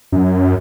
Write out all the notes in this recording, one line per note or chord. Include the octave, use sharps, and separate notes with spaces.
F#2